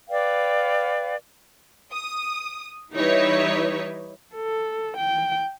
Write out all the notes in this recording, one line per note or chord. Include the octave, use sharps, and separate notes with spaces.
B4 D5 F5 G5
D#6
E3 G3 D#4 E4 B4 C#5
A4
G5